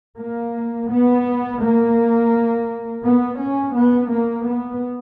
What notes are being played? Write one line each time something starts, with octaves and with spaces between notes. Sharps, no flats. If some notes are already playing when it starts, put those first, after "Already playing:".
A#3
B3
A#3
B3
C#4
B3
A#3
B3